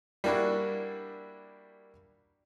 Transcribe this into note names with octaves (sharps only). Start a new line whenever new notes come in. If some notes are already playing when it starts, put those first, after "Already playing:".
G3 A#3 D4 E4 F#4